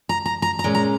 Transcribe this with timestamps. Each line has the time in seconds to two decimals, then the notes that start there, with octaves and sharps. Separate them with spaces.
0.09 A#5
0.26 A#5
0.42 A#5
0.59 A#5
0.64 A#2 G#3 C#4
0.75 A#5